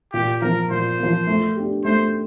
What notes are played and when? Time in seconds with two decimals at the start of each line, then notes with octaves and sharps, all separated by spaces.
0.13 A#2 G4
0.42 F3 A#3 A#4
0.71 A#2 C5
0.99 F3 A#3
1.27 A3
1.56 D4 G4
1.85 A3 C5